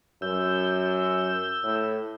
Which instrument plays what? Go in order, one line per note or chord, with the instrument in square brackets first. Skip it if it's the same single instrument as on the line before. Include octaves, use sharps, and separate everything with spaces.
[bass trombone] F#2 [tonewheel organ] E6 G6
[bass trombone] A2